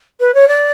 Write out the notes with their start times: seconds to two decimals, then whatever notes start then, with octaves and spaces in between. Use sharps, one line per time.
0.20 B4
0.34 C#5
0.48 D5